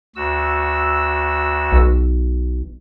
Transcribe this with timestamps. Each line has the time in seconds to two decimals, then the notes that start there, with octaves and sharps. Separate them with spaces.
0.16 D2 F#4 E6
1.72 B1